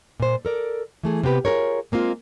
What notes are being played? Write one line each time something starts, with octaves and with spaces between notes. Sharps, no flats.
A#2 C5
A4 A#4 D5
E3 A3 G#4
C3 B3 G4 B4
F4 F#4 G#4 A#4 C#5
G#3 A#3 C4 F4